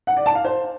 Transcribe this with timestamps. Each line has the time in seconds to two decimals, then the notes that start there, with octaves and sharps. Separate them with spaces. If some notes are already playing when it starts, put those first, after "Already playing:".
0.07 F#5
0.17 D5
0.26 A5
0.35 F5
0.45 C5